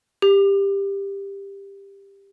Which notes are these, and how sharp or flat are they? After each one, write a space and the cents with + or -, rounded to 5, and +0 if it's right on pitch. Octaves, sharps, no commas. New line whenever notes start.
G4 +15